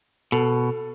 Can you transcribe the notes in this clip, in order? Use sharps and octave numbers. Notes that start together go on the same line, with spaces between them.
B2 A4